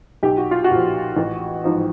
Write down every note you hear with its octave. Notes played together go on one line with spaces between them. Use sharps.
B1 G4
F#4
F4
F#4
A#2 F3
A1
G#2 F3